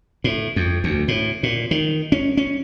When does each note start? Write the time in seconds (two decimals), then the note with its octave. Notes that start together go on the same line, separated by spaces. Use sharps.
0.24 A2
0.56 F2
0.84 D2
1.08 A2
1.43 A#2
1.71 D#3
2.12 C#4
2.37 C#4